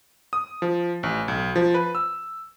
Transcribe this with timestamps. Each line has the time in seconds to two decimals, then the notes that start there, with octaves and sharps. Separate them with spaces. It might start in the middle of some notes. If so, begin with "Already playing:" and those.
0.33 D#6
0.62 F3
1.03 A1
1.28 B1
1.56 F3
1.74 B4
1.95 E6